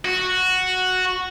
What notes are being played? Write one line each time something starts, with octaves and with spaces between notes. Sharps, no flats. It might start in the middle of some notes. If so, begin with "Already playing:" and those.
F#4